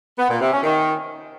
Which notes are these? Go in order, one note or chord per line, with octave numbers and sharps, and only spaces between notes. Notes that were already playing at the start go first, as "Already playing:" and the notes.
B3
A#2
C3
C#4
D#3